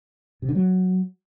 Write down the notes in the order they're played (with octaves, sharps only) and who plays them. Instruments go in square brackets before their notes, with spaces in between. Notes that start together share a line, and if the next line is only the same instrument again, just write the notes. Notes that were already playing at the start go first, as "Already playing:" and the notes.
[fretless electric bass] C3
D3
F#3